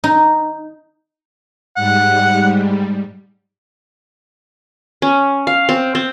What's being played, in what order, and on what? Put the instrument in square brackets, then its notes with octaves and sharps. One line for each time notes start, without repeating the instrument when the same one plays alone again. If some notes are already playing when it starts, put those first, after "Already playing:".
[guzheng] D#4
[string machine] G#2 G3 [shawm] F#5
[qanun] C#4
F5
C4
C4